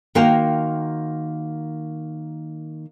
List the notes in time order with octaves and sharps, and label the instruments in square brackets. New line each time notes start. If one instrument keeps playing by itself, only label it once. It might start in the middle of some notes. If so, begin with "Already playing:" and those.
[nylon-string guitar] D#3 A#3 F#4 C5 F5 G5